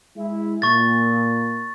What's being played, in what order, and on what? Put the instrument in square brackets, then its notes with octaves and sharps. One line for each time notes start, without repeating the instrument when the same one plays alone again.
[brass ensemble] G#3 E4
[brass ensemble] A#2 [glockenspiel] C#6 A6